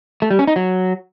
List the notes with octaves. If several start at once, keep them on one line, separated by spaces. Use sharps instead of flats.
A3
G3
C#4
D#4
F#3